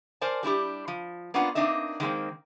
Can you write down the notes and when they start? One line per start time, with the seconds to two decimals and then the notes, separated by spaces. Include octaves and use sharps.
0.21 A#4 C5 D5 G#5 A5
0.43 G3 D4 E4 G4
0.88 F3
1.34 A#3 B3 C#4 D4 F4 F#5
1.55 A#3 C4 D4 D#4 D#5 E5
2.00 D#3 G#3 A#3 C4